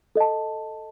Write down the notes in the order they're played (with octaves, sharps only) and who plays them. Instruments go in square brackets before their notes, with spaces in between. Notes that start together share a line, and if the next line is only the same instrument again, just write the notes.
[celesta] A4 D#5 A5